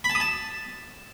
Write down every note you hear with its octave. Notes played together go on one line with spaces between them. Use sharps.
B5
A5
D#6
A5